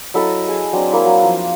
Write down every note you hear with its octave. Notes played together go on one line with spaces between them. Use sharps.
F#3 E4 A4 D#5
G#4 G#5 A5
F#3 C4 D4
A#3 E4
F#3
F3